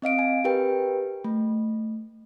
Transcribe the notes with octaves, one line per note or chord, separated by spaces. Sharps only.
C4 D#5 F5 D7
G#5
G4 A#4 B4 G5
A3